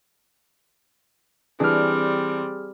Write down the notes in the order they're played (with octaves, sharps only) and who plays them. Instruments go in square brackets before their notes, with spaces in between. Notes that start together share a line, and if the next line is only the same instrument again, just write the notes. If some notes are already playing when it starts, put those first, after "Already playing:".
[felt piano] E3 D4 [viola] G3 C4 [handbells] G#4 F6